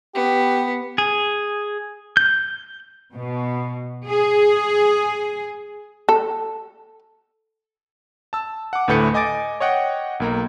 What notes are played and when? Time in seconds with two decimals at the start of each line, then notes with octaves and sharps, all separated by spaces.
0.15 B3 G4
0.98 G#4
2.17 G6
3.15 B2
4.07 G#4
6.09 A4
8.33 A5 E6
8.73 F#5 D6
8.88 D2 A2 A3 B4 G6 C#7
9.14 D#5 G#5 D6 A6 D7
9.60 C#5 D#5 F#5 G5
10.20 B1 A#3 A#5